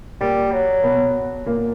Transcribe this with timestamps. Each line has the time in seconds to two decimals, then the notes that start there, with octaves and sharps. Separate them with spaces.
0.20 A#2 G3 A#3
0.52 F#3
0.84 B2 B3
1.46 A#2 A#3